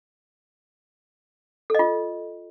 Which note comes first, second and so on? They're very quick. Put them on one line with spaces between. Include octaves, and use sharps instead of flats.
A4 D#5 F4